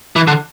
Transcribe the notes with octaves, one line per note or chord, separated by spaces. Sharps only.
E3
D3